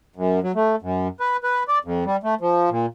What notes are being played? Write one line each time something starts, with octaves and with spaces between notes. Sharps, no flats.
F#2
F#3
A3
F#2
B4
B4
D5
F2
G3
A3
F3
A#2